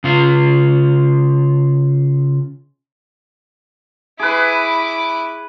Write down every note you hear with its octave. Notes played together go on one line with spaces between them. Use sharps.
C#3 F4
E4 G#4 B4 D6